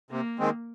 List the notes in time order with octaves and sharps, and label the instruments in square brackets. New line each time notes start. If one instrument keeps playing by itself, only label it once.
[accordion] C3 [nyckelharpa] A#3
[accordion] D#3 G#3 C4